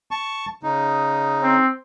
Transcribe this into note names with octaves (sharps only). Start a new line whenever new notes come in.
A5 C#6
C#3 D#4
C4